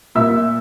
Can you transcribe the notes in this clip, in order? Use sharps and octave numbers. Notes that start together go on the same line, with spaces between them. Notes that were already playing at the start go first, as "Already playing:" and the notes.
A#2 E5 E6